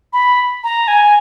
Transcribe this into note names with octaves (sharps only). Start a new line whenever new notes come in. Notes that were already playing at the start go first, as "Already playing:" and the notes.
B5
A#5
G#5